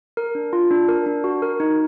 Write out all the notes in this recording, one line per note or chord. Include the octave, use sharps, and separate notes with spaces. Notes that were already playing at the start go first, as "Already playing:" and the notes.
A#4
D4
F4
D4
A#4
D4
F#4
A#4
D#4